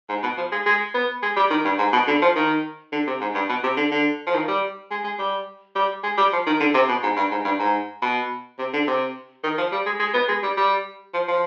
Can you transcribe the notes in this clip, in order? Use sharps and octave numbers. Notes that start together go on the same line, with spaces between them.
G#2
B2
F3
G#3
G#3
B3
G#3
G3
D#3
G2
G#2
B2
D3
F3
D#3
D3
C3
G#2
G2
B2
C3
D3
D3
F3
D#3
G3
G#3
G#3
G3
G3
G#3
G3
F3
D#3
D3
C3
B2
G#2
G2
G#2
G2
G#2
B2
C3
D3
C3
D#3
F3
G3
G#3
G#3
B3
G#3
G3
G3
F3
F3